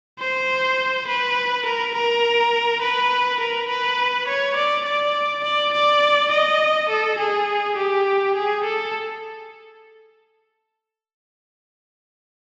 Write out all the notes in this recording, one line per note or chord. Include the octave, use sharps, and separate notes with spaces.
C5
B4
A#4
A#4
B4
A#4
B4
C#5
D5
D5
D5
D5
D#5
A4
G#4
G4
G#4
A4